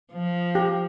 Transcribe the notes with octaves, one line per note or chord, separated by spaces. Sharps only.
F3
G4